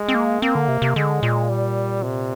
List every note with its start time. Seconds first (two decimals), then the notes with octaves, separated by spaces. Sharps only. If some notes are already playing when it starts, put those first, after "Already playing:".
Already playing: G#3
0.08 C4
0.15 A#3
0.42 A#3 C4
0.55 D3
0.68 C3
0.82 C3
0.96 D3 G#3
1.23 A#2
1.49 G3
2.03 C3